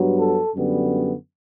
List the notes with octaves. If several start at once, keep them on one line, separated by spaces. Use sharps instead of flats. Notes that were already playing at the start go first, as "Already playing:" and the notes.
Already playing: G2 F#3 B3
A4
F#2 D3 G3 B3